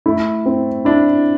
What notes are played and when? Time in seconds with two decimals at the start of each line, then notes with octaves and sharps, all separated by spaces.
0.06 A3 E4
0.46 C4
0.85 D4 E4